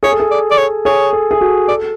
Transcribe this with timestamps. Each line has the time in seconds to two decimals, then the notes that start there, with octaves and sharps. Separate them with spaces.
0.03 G#4 C#5
0.12 A4
0.20 G#4
0.31 D5
0.51 D5
0.58 C#5
0.85 G#4 C#5
1.13 A4
1.31 G#4
1.41 F#4
1.68 A4 D5